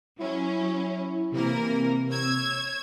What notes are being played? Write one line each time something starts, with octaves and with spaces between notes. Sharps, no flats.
F#3 C#4 E4
C3 E3 A#3 A#4
C#5 E6 G#6